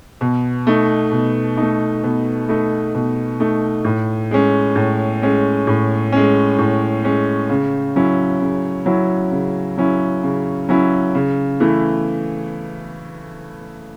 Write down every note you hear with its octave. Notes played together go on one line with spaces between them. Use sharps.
B2
A3 D#4
B2
A3 D#4
B2
A3 D#4
B2
A3 D#4
A2
G#3 C#4
A2
G#3 C#4
A2
G#3 C#4
A2
G#3 C#4
C#3
F#3 C#4 E4
C#3
F#3 C#4 E4
C#3
F#3 C#4 E4
C#3
F#3 C#4 E4
C#3
E3 A3 E4